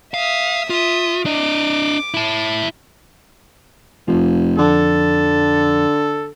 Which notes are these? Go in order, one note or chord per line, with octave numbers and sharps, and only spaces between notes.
E5 F5 D#6
F4 E5 D#6
D4 D#5 D6
E4 A5
F1 F2 F3
D3 A4